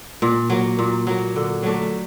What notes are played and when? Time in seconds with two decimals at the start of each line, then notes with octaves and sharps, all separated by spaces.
0.22 A#2
0.50 F#3 A#3
0.79 A#2
1.07 F#3 A#3
1.36 D3
1.63 F#3 A3 D4